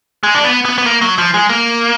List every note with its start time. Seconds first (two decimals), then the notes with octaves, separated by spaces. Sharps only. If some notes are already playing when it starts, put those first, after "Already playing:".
0.23 G#3
0.35 D4
0.44 B3
0.65 B3
0.78 B3
0.86 A#3
1.01 F#3
1.18 F3
1.34 G#3
1.49 A#3